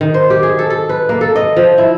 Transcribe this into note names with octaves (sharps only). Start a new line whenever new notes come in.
D#3
C5
G4
G#4
A4
A4
B4
A#3
A4
D#5
F3
E4